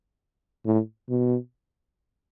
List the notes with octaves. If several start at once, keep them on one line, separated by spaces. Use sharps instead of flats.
A2
B2